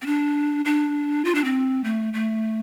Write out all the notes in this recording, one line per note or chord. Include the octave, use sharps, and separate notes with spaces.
C4
D4
D4
F4
D4
C4
A3
A3